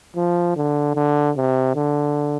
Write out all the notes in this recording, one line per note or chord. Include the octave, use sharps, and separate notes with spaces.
F3
D3
D3
C3
D3